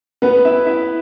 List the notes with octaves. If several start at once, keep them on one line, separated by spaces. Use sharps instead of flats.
B3 B4
E4 E5
E4 E5